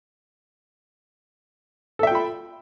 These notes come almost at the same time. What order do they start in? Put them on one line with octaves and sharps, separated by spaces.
A4 E5 G5 F4 B5